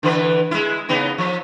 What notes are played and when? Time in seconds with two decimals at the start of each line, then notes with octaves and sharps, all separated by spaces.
0.03 D3 E3 B4
0.51 G#3 E4
0.89 C#3 B3 D#4
1.18 F3